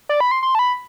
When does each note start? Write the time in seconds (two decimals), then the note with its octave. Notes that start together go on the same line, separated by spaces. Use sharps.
0.09 D5
0.20 B5
0.31 C6
0.43 C6
0.55 A5
0.59 B5